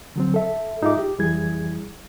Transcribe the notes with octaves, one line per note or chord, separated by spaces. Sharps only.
D3 F#3 C4
A4 E5
G#2 D#4 F4 G#4 E5 D6
G4
F2 E3 G3 E4 G#4 G#6